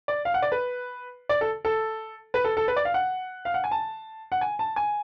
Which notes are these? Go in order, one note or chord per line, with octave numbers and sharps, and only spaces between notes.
D5
F5
F#5
D5
B4
D5
A4
A4
B4
A4
A4
B4
D5
F5
F#5
F5
F#5
G#5
A5
F#5
G#5
A5
G#5